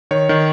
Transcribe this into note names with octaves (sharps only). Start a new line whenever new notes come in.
D#3 C#5
D#3